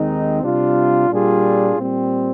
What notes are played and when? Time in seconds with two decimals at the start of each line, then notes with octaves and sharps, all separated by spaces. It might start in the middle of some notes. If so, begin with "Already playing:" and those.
Already playing: D#2 D#3 G#3 C4 D#4
0.42 C3 G3 D4 F4
1.09 A#2 G3 D4 F4 G#4
1.76 A#2 G3 C4